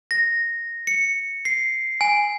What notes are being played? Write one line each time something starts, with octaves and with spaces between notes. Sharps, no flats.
A#6
C#7
C7
G#5